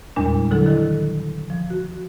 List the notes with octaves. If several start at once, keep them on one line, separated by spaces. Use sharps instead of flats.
E2 A#2 G3 G#3 D4
D3 F#3 E4 A4
D#3 A4
F3
F#4